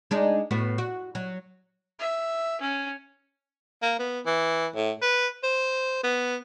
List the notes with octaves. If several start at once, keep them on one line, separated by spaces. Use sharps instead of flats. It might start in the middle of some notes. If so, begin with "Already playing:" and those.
G#3 D4 D#4
A2 B3 F#4
F#4
F#3
E5
C#4
A#3
B3
E3
A2
B4
C5
B3